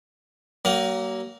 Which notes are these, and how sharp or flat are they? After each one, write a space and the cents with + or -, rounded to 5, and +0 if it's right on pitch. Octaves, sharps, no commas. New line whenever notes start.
F#3 +40 A#3 +0